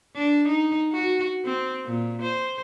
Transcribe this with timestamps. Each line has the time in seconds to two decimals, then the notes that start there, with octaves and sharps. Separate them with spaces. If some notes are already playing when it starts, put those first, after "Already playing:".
0.16 D4
0.48 D#4
0.93 F#4
1.45 C4
1.86 A#2
2.22 C5